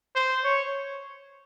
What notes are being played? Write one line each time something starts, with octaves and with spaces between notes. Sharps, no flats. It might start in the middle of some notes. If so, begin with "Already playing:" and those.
C5
C#5